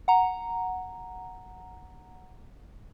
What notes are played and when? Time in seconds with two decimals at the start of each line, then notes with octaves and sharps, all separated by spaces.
0.08 F#5 A#5